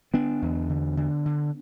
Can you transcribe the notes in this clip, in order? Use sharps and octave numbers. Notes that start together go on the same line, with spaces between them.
D3 B3 D4
E2
D3
D3
D3